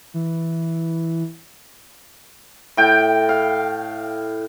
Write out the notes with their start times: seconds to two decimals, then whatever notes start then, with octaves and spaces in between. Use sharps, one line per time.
0.14 E3
2.77 A2 G5
3.29 F5